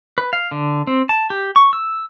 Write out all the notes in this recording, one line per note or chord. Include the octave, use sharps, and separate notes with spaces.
B4
F5
D3
C4
A5
G4
C#6
E6